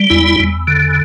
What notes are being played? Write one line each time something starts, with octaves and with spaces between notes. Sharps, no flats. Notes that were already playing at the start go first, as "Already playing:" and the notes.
Already playing: G3
E2 E4
E2
D3